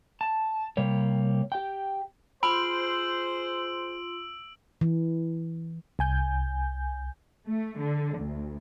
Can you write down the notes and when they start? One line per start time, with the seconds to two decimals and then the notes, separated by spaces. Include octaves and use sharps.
0.21 A5
0.77 C3 G3 A#3 C#5
1.52 G4 G5
2.43 F4 G#4 C5 B5 C6 E6 D7 F#7
4.81 E3
5.99 C2 G#5 G6
7.47 A3
7.80 D3
8.20 D2